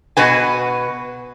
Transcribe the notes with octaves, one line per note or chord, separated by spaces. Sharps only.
B2 F#4 B4 G#5